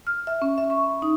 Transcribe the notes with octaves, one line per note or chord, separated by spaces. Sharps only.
F6
E5
C#4
E5
C#6
B5
D#4